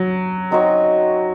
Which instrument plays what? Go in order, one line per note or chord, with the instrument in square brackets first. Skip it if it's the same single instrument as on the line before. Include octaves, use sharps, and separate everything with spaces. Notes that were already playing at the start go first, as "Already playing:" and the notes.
Already playing: [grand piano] F#3
[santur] C4 D#4 F#4 C#5